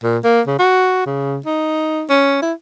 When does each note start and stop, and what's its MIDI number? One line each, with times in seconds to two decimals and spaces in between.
0.03 0.18 46
0.24 0.41 58
0.47 0.58 49
0.59 1.06 66
1.06 1.38 49
1.46 2.05 63
2.10 2.41 61
2.42 2.53 64